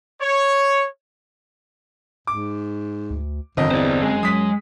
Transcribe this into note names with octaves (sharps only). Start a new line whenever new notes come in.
C#5
G#2 D6
D2
G1 F2 D#3 D#5
E2 C4 C5 D5
F#2 G#3 G#4
F#3 D#6 B6